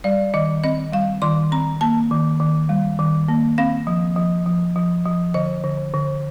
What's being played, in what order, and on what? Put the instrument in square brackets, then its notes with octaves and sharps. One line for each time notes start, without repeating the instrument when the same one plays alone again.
[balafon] G3 D5
D#3 D#5
C4 D#5
G3 F5
D#3 C6
C4 A#5
A#3 A5
D#3
D#3
G3
D#3
A#3
C4 F5
F3
F3
F3
F3
F3
D3 D#5
D3
D3